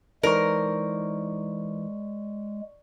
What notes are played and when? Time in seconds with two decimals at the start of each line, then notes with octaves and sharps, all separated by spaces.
0.23 E3 G#3 D#4 A#4 C5 D5 C#6